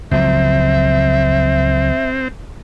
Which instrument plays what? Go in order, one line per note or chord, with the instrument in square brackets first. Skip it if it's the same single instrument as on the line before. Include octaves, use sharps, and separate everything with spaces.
[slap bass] C#2 F3 F#3 [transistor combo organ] C4 [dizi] E5